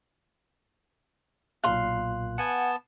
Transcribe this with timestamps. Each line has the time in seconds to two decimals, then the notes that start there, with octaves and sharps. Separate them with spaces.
1.64 B1 A#2 F5 C6 F#6
2.38 B3 F#5 G#5 A5 G#6